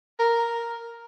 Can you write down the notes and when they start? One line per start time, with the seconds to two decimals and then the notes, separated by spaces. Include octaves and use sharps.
0.20 A#4